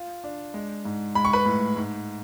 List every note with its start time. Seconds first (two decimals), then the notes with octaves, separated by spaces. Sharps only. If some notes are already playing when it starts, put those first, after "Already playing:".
Already playing: F4
0.24 D4
0.54 G#3
0.85 G#2
1.15 G#3 B5
1.25 C#6
1.33 B4 B5
1.45 A2
1.77 G#2